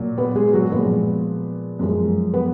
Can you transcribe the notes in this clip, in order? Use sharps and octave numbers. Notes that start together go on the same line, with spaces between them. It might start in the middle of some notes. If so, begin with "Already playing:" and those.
Already playing: A#2 F#3
B3 B4
G#3 G#4
F#3 F#4
A#2 F3 G#3 B3 B4
F#2 F3 G#3
B3 B4